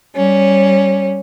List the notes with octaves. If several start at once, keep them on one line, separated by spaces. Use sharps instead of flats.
G3 C#4